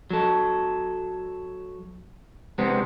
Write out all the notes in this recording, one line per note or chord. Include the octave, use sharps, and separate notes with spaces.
F#3 A4
C3 G#3 B3 C4